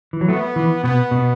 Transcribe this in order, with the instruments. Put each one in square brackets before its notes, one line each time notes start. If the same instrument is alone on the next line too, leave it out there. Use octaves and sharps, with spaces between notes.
[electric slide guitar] E3
F#3
[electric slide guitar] A3 [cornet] B3
[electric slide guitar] E3
[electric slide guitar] B2 [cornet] B3
[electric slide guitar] B2